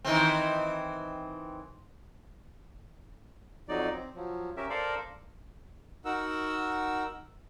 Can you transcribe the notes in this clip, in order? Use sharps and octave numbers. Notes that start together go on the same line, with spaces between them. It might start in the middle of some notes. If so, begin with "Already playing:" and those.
D#3 E3 C4
F2 F#3 D#4 D5
C4
F3 F#3
C#4 G4 A#4 E5
A4 A#4 C5 D5 F5
D#4 F#4 A#4 F#5 E6